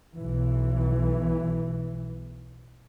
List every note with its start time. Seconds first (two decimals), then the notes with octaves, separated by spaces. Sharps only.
0.15 B1 E3